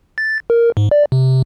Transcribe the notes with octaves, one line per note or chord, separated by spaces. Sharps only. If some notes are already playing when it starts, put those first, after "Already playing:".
A6
A#4
G#2
D5
C3